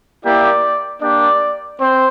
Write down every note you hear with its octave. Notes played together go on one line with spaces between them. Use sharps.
A#3 E4 G4 D5
A#3 D4 G4 D5
C4 C5